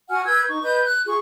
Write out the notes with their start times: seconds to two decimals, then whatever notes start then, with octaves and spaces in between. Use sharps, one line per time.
0.09 F#4 F#5 G#5 F6
0.25 B4 E6 G6 G#6
0.48 D#4 C#6
0.63 B4 D#5 G6
0.82 F#6
1.06 F4 G#4 C#6